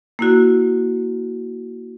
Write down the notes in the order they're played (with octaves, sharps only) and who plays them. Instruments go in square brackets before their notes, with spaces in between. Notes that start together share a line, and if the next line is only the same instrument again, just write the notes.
[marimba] A#3 E4 F#4